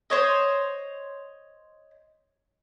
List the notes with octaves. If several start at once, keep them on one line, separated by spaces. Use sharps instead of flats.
C5 C#5 D#5